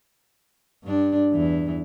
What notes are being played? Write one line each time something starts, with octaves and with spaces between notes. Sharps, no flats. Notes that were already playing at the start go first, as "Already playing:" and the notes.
G2 D4
E2 E3